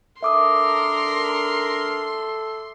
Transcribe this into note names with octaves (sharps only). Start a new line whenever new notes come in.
D4 A4 A#4 E5 C6 D6 D#6